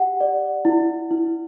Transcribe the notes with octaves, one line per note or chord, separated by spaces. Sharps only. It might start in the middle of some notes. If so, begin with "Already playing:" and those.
Already playing: G4 F#5
D5
E4
E4